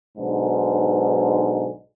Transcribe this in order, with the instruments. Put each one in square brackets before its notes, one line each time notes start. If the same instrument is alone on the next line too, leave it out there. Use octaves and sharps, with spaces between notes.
[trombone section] B1 G#2 D3